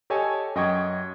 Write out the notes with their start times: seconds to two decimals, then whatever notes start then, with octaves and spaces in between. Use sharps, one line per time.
0.10 G4 A4 C#5 D#5 G#5 A5
0.55 F#2 D#5 G5 C#6 G#6